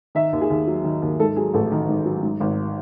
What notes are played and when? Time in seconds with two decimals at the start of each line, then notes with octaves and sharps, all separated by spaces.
0.15 D#3 E5
0.33 D#2
0.41 G#4
0.50 D#2
0.67 F#3
0.84 D#3
1.02 D#2
1.19 G#2 A4
1.37 F#3 G#4
1.54 A1 A4
1.71 D#3
1.89 G#2
2.06 F#3
2.23 G#2
2.40 G#1